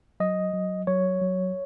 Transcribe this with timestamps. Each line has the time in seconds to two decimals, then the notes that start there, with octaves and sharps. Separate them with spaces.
0.20 F#3 D#5
0.54 F#3
0.87 F#3 C#5
1.21 F#3